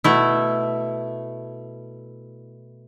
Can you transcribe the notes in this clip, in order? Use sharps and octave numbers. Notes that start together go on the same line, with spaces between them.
B2 A3 E4